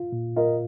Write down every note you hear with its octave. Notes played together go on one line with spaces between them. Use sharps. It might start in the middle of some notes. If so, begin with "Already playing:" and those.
Already playing: F4
A#2
F4 A#4 D#5